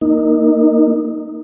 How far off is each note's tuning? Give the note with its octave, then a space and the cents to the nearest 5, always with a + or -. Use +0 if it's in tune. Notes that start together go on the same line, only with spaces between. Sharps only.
A#3 +0 D#4 +0